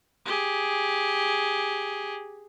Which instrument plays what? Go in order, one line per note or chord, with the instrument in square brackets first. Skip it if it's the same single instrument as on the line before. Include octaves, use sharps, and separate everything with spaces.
[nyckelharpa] G4 G#4